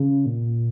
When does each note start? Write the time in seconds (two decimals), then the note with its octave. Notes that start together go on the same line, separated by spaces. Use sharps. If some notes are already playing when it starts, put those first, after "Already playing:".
Already playing: C#3
0.26 A#2